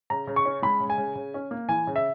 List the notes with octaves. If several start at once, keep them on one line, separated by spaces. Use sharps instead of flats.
C#3 A#5
C#3
C#6
C#4
G#3 B5
C#3
G#5
C#3
C#3
C#4
A#3
E3 G#5
C#3
E5